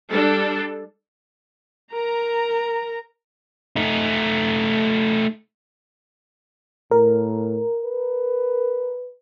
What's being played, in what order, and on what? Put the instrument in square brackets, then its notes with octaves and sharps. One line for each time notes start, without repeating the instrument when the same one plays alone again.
[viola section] G3 D4 A4
[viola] A#4 A#5
[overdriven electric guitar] A3 D#4
[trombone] A2 [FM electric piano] A#4
[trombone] B4